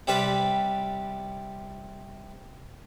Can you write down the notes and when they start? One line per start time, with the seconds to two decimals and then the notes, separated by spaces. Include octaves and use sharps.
0.07 C3 G3 G4 B4 A5